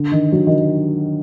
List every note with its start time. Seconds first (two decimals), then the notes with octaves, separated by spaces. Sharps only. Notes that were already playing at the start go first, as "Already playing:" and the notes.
Already playing: D3
0.12 D#3
0.32 F#3
0.47 D#3